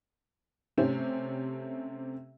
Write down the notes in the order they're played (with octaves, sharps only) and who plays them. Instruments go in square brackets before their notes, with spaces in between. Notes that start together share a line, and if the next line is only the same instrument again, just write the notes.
[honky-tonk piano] C3 A3 C4 C#4 G4